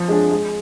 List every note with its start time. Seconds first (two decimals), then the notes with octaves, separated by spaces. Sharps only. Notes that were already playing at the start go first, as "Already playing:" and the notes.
Already playing: F3
0.08 G#3 D4 G#4
0.31 G#3